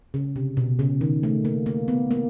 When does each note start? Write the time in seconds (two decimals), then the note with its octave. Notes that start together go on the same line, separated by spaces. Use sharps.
0.14 C#3
0.36 C3
0.57 B2
0.79 C#3
1.01 D#3
1.23 A3
1.45 A#3
1.66 A#3
1.88 B3
2.11 A#3